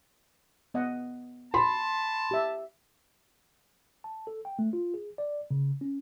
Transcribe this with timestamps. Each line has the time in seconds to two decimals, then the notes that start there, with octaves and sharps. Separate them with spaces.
0.74 B3 D#5 F#5
1.54 A5 B5 C6
2.31 G4 E5
4.04 A5
4.27 A4
4.45 G5
4.59 A3
4.73 F4
4.94 G#4
5.18 D5
5.51 C#3
5.81 C#4